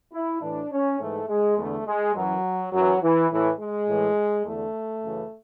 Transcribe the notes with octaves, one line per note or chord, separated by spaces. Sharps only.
E4
A2 E3 D4
C#4
G#2 E3 A3
G#3
E2 D3 A3
G#3
F#2 E3 F#3
F#2 E3 F#3
E3
A2 E3
G#3
A2 E3
E2 D3 A3
F#2 C#3 E3